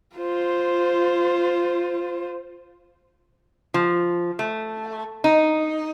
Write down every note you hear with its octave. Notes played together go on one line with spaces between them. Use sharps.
F4 C5
F3
A3
D#4